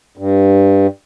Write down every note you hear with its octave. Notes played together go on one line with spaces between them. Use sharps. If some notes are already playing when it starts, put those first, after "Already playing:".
G2